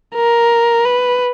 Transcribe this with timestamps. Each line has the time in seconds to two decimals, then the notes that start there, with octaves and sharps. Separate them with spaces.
0.16 A#4
0.85 B4